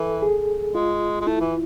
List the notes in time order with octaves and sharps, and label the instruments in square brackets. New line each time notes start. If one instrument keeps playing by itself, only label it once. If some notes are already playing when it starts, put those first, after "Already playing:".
Already playing: [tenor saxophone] E3 [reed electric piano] A4
[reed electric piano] G#4
[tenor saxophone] G#3 [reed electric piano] F4
[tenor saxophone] G#3
[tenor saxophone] A3 [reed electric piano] E4
[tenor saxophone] E3